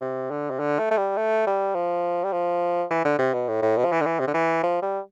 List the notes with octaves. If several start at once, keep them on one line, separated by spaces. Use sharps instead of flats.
C3
D3
C3
D3
A3
A3
G3
A3
G3
F3
G3
F3
E3
D3
C3
B2
A2
A2
B2
F3
E3
D3
E3
C3
D3
E3
F3
G3